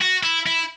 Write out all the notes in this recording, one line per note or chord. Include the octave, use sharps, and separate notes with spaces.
F#4
E4
E4